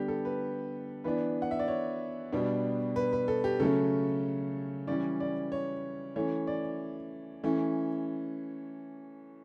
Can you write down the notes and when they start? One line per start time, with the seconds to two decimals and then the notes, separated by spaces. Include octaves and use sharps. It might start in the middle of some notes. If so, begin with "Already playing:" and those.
Already playing: D3 G3 B3 G4
0.08 A4
0.25 B4
1.04 E3 B3 D4 B4
1.42 F#5
1.51 E5
1.59 D5
1.68 C#5
2.32 B2 G3 B3 D4
2.96 B4
3.13 B4
3.28 A4
3.44 G4
3.60 C#3 F#3 A3 C#4 A4
4.87 E3 G3 C#4 D5
5.20 D5
5.52 C#5
6.16 E3 A3 C#4 C#5
6.47 D5
7.43 E3 A3 C#4